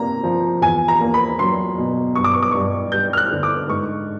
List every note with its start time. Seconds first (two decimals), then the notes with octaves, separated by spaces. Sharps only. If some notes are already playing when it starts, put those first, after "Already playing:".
Already playing: C3 A#3 A#5
0.23 F3
0.62 E2 G#5
0.88 A#5
1.01 A#3
1.14 B5
1.39 F#3 C6
1.78 B2
2.15 G2 C#6
2.24 D6
2.33 C#6
2.42 D6
2.51 G2 C#6
2.92 G3 G6
3.13 F6
3.17 F#6
3.31 D3
3.43 D6
3.68 G#2 C#6